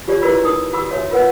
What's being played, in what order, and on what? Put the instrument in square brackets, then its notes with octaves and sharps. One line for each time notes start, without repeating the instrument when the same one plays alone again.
[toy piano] F4 G4 C#5 D5
E4 F#4 A#4 B4 D5 B5
D#4 A#4 D#6
F#4 B5 D6 E6
F#4 C#5 E5
F4 A#4 B4 E5 F#5